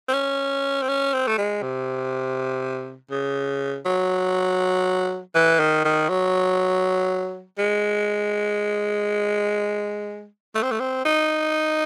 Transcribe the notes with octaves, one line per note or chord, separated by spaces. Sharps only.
C4
C#4
C4
C#4
C4
A3
G#3
C3
C#3
F#3
E3
D#3
D#3
F#3
G#3
A3
C4
A3
C4
D#4